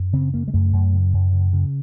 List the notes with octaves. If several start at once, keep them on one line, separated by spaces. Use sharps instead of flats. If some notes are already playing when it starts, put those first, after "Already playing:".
Already playing: F#2
C#3 C4
C#3 A#3
G#3
F#2 A3
F#2
C#3
F#2
C#3
C#3